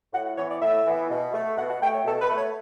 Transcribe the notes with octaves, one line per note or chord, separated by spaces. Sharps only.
A2 F#5
F#5
E3 B3 C#5
D5
A2 E5
E3 B3
B2
A3
B2 F#5
F#5
A3 G5
C#5
B2 A4
B4
A3
C#5